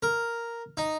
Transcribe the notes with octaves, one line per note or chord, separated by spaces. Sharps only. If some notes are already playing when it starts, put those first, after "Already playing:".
A#4
D#4